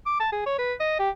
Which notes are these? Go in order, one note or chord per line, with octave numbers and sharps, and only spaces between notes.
D6
A5
G#4
C#5
B4
D#5
G4